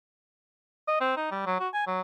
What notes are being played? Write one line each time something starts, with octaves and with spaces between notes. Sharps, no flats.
D#5
C4
D#4
G3
F#3
F#4
G#5
F#3